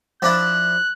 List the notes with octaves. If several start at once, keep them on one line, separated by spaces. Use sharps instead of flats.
F3 D4 E4 F#6